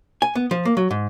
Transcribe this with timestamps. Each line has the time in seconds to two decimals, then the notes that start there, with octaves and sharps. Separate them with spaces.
0.22 G#5
0.35 B3
0.51 F3
0.65 A#3
0.77 F#3
0.91 G#2